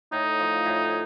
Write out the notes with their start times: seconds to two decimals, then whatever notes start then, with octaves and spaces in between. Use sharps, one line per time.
0.12 A2 D#4
0.39 F3
0.66 A2